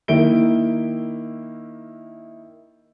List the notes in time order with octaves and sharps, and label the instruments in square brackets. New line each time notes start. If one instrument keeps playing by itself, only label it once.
[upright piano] D#3 A#3 E4 E5 D7 G7